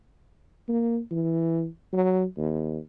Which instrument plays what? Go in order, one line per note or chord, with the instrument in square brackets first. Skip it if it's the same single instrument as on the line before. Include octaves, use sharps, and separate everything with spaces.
[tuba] A#3
E3
F#3
D#2